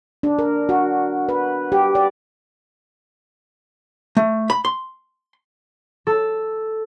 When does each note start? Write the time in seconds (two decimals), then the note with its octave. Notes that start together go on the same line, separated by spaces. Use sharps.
0.23 D4
0.39 A#4
0.69 F#4
1.29 B4
1.72 G4
1.95 D5
4.17 A3
4.50 B5
4.65 C6
6.07 A4